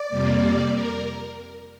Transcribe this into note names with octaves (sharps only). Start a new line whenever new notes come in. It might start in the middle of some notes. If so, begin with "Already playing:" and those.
Already playing: D5
F2 C3 G3 A#3
A#4